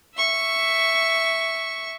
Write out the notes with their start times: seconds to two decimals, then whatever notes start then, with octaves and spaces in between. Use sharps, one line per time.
0.15 E5 C#6